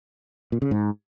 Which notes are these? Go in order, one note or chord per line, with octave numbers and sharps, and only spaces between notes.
A#2
C#3
G#2